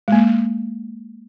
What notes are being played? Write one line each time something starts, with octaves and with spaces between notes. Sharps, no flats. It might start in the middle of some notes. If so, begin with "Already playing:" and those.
G#3 A#3